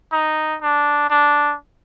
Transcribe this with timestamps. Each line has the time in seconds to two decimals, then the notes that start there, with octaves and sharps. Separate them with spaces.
0.13 D#4
0.62 D4
1.10 D4